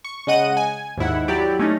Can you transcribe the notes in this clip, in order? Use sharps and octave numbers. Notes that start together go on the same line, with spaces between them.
C#6
C#3 G#3 D#5 F#5 D#7
G#5
D#2 G#2 E4 F#5
F#3 E4 G4 D5
A3 C#4 D#4